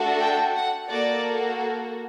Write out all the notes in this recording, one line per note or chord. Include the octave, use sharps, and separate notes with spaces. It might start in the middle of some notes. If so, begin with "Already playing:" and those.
Already playing: A3 D4 F#4 A4
G5
F#5
A#3 F#4 A4 D5